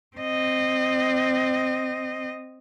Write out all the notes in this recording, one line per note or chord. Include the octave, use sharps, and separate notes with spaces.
C4 D#5